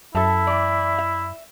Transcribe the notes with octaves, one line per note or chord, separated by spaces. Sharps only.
F#2 E4 A4 E5 A5
E3 D5
E5